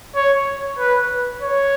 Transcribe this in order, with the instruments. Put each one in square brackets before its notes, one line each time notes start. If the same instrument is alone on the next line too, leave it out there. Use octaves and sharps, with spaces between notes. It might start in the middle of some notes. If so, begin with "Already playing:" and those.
[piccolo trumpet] C#5
B4
C#5